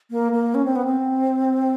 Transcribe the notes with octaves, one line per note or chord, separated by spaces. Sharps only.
A#3
A#3
C#4
C4
B3
C4